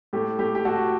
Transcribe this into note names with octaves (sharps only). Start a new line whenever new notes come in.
A2 G4
A2 G4
G4
A2 F#4 A4